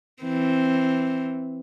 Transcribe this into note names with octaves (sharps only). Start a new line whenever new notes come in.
E3 C4